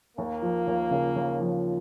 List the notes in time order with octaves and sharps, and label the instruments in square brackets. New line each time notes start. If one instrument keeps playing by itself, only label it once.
[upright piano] D#2 [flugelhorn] A#3
[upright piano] F3
D#2
C#3
D#2
F3